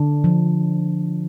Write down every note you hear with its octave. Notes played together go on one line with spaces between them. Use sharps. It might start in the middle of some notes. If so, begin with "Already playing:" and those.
Already playing: D3 D4
F3